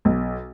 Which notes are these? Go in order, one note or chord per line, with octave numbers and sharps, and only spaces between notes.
B1